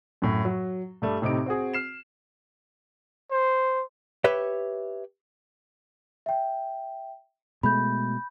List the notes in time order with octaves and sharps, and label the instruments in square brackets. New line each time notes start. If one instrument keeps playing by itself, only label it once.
[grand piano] F#2 A2
F#3
G2 G3 A3
A2 C3 D#4 D6 D7
C4 F#4 G#4
F6 C7 E7
[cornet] C5
[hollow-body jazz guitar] G4 B4 C#5 E5
[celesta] E5 G5
[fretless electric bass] B2 G#3 A3 [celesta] B5 G6